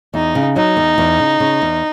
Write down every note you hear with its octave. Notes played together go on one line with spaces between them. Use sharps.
E2 D#4
C#3
F#3 D#4
E2
E2
C#3
C#3
E2